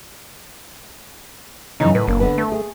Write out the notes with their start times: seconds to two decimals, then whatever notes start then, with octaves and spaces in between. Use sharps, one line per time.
1.80 F#2 C#3 E3 D#4
1.95 A2 B4
2.07 F#1 A#3 D4
2.20 D3 B3 B4
2.38 A3
2.52 G#4